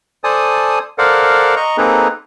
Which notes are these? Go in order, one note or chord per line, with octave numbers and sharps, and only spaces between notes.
A4 C5 D5 G#5 A5 D#6
A4 A#4 C5 D5 F5 F#5
D#5 A#5 C#6
A#3 C4 D#4 G#4 A4 B4